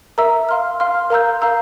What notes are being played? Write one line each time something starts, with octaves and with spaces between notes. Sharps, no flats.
A#4 E5 A#5 E6
F5 C6 F6
F5 C6 F6
A#4 F5 A#5 E6 G6
A#4 F5 A#5 E6 G6